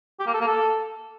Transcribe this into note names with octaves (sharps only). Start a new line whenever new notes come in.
G4
A#3
A4
A#3
A4